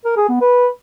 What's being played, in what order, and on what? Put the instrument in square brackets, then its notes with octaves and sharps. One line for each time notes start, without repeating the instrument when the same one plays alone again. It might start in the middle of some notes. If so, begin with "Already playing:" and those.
[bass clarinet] A#4
G#4
B3
B4